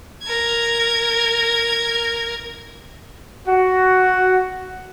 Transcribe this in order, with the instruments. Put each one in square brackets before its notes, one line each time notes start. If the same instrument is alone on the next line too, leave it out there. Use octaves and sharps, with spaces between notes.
[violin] A#4 G#6
[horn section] F#4